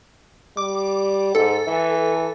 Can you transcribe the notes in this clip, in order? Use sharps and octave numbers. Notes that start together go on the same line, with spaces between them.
G3 D6
G#2 A4
E3